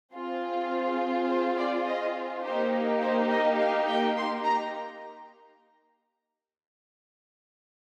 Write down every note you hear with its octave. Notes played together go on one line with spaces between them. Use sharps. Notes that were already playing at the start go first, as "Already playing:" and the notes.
C4 F4 G#4
C5
D5
D#5
A#3 D#4 G4 C5
C5
D#5
F5
G5
C6
A#5